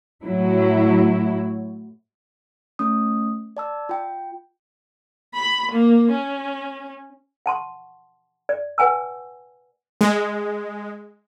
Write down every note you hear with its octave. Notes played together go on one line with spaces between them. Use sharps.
A2 F#3 E4
A3 C#4 D#6
D5 A5 E6
F4 G5
B5
A#3
C#4
F#5 A5 C6 C#6
D5
B4 F#5 G#5 A5 E6
G#3